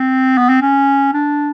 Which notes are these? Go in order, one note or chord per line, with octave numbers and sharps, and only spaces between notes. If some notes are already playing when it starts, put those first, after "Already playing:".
Already playing: C4
B3
C4
C#4
D4